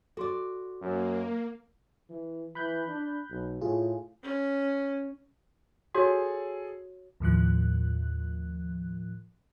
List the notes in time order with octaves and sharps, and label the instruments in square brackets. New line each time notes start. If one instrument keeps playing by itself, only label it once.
[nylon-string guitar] F#4 D5 [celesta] A4 C6 D6
[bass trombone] F#2 [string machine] A#3
[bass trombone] E3
[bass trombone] E3 [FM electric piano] B5 F#6 G6
[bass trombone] D4
B1
[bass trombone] A2 [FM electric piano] F4 G#4
[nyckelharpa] C#4
[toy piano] F#4 C#5 [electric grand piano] G#4 A4
[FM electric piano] D#2 A2 F3 F#6